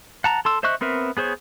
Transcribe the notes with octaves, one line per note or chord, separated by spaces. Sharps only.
F#5 A5 A#5
A4 C6 E6
C5 D#5 E5 C#6 F#6
B3 C4 A#4 B4 E5
B3 G#4 C5 C#5